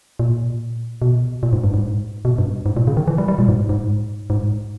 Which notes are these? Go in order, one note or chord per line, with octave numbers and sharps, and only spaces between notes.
A#2
B2
A#2
G#2
G2
G#2
B2
G2
G#2
A#2
C#3
D#3
E3
G3
G3
A#2
G#2
G#2
G#2